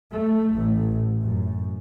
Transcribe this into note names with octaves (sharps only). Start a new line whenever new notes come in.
A3
A1
F#2